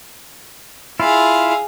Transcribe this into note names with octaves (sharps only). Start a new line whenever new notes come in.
E4 F4 G#4 F5